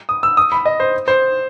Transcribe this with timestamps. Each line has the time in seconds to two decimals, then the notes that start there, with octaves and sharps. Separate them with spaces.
0.09 D#6
0.23 E6
0.37 D#6
0.52 B5
0.66 D#5
0.80 C5
1.08 C5